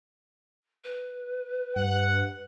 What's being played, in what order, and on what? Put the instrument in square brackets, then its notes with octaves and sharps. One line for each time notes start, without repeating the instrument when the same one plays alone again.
[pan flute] B4
[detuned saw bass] G2 [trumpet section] F#5